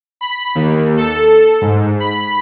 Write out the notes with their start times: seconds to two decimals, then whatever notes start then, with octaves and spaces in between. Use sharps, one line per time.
0.21 B5
0.55 D#2
0.97 A4
1.61 G#2
2.00 B5